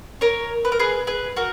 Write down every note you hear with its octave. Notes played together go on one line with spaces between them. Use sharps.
A#4 C#5
B4
A#4
G#4 B4
G#4 B4
F#4 A#4